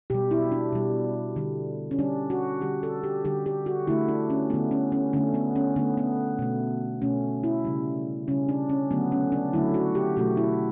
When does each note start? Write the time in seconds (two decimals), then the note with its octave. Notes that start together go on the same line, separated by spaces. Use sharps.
0.10 B2 G3 G4
0.31 E4
0.52 D4
0.73 B2 G3
1.36 D3 G3
1.91 C#4
1.99 D3 G3 D4
2.30 F#4
2.61 D3 G3 G4
2.83 A4
3.03 G4
3.25 D3 G3 G4
3.46 G4
3.66 F#4
3.87 D3 A3 E4
4.08 D4
4.30 C#4
4.50 D3 A3 B3
4.71 C#4
4.92 C#4
5.13 D3 A3 C#4
5.34 B3
5.56 C#4
5.76 D3 A3 B3
5.97 B3
6.39 B2 A3
7.02 B2 A3 C#4
7.44 E4
7.65 C#3 G3
8.28 C#3 G3 C#4
8.49 D4
8.69 C#4
8.91 D3 F#3 A3 B3
9.12 C#4
9.32 D4
9.53 D3 F#3 A3 E4
9.74 F#4
9.95 G4
10.16 B2 F#3 A3 F#4
10.37 E4